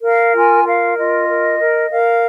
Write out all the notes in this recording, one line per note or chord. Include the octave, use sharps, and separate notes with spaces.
A#4 F5
F4 G#5
A#4 F5
F4 D#5
A#4
A#4
A#4 F5